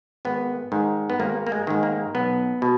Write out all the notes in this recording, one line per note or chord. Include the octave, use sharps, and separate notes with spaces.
G#1 B3
G#2 D#3
B3
G#1 A#3
A#3
G#3
G#2 D#3
A#3
B1 B3
B2